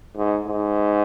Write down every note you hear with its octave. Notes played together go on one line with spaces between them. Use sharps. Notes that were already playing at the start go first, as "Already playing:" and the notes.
G#2
G#2